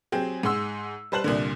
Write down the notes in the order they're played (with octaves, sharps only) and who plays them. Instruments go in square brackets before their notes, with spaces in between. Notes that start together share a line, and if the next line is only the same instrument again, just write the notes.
[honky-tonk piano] F#3 C4 G4 G#4
G#2 G#4 F#5 C6 E6
G3 B4 C5 A5 F#6 F#7
C2 A#2 D3